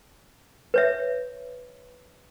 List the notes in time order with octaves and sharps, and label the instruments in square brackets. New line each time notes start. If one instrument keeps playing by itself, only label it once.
[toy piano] B4 C#5 E5